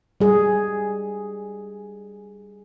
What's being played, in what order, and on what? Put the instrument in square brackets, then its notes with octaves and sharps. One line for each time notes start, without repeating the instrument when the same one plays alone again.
[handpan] G3 G#4